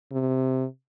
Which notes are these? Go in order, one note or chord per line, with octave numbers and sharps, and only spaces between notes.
C3